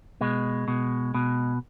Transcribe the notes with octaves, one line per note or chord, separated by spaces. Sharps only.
B2 G#3
B2
B2